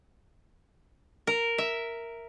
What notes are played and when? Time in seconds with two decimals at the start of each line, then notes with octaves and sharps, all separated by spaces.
1.27 A#4
1.58 E5